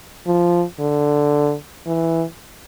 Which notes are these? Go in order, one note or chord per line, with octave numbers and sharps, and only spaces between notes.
F3
D3
E3